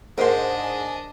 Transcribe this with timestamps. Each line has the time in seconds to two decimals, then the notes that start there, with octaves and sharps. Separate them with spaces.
0.18 G#2 D4 A#4 C5 D#5 F#5
0.62 G#5